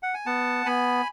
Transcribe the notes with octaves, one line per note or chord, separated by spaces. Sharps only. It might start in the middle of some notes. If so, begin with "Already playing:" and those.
F#5
G#5
B3 F#5 A5
B3 G#5 B5